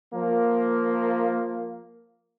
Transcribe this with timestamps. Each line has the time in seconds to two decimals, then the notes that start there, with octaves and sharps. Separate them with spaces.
0.14 F3 A#3